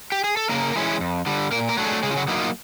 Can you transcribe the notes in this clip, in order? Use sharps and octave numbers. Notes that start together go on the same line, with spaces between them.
G4
G#4
A4
C#3 A#3 A#4
E3 G#3 C#4 E4
F2
D3 G3
A#2 A#3 A#4
A#3 A#4
F#3 A3 D4
G#3 G#4
C#3 G#3 G#4
F4
F#3 F#4
F#3 A#3 D#4 E4
F4